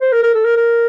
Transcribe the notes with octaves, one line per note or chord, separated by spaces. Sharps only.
C5
A#4
A#4
A4
A#4
A#4